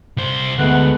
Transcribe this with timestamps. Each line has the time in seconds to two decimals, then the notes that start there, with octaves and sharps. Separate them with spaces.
0.17 C2 C5
0.59 D2 G#3 A3 B3 F#5